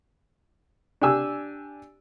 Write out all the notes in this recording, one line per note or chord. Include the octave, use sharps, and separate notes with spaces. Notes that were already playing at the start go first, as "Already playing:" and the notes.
D4 G4 G#5 E6